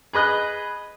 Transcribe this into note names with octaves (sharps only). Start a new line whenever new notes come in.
G#4 B4 D#5 F#6